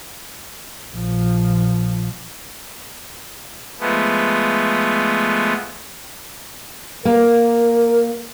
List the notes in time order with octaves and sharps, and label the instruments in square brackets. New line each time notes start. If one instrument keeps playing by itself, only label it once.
[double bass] A#1 F3
[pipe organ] F3 G#3 A3 B3
[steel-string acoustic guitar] A#3 [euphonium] A#4